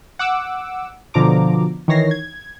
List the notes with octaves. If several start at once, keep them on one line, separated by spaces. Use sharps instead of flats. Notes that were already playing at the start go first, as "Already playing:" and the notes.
F#5 D6 E6
B2 D3 F3 A#5 D6
D#3 E3 C#5 A#6 C7
G#6